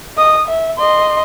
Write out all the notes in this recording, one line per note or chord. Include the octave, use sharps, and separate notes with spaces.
D#5 D#6
E5
D#5 C6